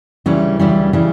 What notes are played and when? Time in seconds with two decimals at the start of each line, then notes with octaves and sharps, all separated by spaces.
0.26 D2 C#3 E3 G3 C#4
0.59 D2 C#3 E3 G3 C#4
0.93 C#3 E3 G3 C#4